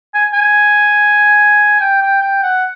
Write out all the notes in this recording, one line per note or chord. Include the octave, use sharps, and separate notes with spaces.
G#5
G#5
G5
G5
G5
F#5